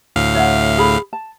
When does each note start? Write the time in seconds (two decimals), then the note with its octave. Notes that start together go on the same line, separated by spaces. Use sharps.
0.16 D2 A2 F5
0.35 C#5 E5 F#5
0.78 G#4 B5
1.13 A5